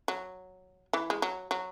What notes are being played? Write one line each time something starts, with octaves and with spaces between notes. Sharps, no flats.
F#3
E3
G#3
F#3
F#3